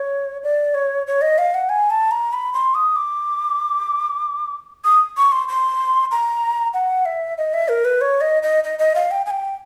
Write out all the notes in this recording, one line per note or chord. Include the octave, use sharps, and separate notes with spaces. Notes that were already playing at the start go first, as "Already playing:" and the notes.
Already playing: C#5
D5
C#5
C#5
D#5
F5
F#5
G#5
A5
A#5
B5
C6
D#6
D6
D#6
C#6
C6
C6
A#5
F#5
E5
D#5
E5
A#4
B4
C#5
D#5
D#5
D#5
D#5
F5
G5
G#5
G5